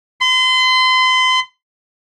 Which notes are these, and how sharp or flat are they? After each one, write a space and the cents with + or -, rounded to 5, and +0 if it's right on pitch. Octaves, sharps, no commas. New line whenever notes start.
C6 -35